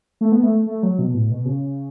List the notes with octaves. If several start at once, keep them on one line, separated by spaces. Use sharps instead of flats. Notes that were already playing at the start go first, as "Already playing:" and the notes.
A3
B3
A3
A3
F#3
B2
A2
B2
C#3